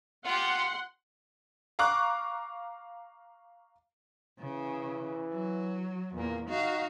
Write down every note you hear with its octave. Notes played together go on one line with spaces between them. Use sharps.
F4 G4 F#5 C6
F5 A#5 C#6 D6 F#6
C#3 E3
F#3
E2 A#2 A#3
D#4 F#4 F5